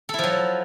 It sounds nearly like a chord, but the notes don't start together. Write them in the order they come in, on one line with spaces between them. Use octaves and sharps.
A4 E4 F3 F#3